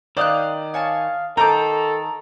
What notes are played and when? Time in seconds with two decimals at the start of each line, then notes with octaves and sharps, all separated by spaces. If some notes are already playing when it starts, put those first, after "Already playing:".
0.17 D#3 C5 D5 F5 D#6 F#6
0.74 C#5 F5 G#5 A5
1.37 D#3 A4 C5 A#5 D6